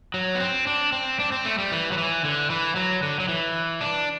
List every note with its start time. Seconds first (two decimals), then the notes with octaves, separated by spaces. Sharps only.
0.14 F#3
0.35 B3
0.40 C4
0.67 D4
0.92 C4
1.20 D4
1.32 C4
1.45 A3
1.58 G3
1.72 E3
1.92 F#3
1.98 E3
2.25 D3
2.50 E3
2.76 F#3
3.03 D3
3.20 F#3
3.28 E3
3.81 D4